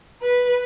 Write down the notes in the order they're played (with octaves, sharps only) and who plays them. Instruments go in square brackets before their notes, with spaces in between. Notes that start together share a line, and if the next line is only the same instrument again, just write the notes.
[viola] B4